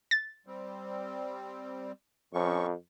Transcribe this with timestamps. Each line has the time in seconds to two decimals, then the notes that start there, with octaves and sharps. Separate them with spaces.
0.11 A6
0.46 G3 C4
2.33 F2 F3 C#4 C#6